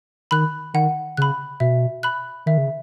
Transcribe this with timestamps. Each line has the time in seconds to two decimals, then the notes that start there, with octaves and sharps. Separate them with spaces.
0.31 D#3 B5 F#6
0.74 D#3 F#5
1.17 C#3 B5 F#6
1.60 B2 E5
2.03 B5 F#6
2.46 D#3 E5
2.58 C#3